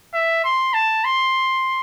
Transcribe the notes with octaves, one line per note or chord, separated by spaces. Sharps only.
E5
C6
A5
C6